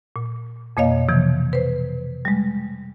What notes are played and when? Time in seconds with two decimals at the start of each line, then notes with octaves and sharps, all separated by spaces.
0.16 A#2
0.77 F2 B2 A#3 C#5 D#5 F5
1.09 C3 E3 F3
1.53 B4 C5
2.25 G3 G#3